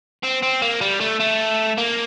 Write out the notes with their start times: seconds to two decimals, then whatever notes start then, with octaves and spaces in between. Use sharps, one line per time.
0.23 C4
0.42 C4
0.62 A#3
0.81 G3
1.00 A3
1.20 A3
1.78 A#3